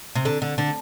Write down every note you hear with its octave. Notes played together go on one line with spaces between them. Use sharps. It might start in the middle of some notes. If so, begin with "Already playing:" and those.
C3
D3
D3
D3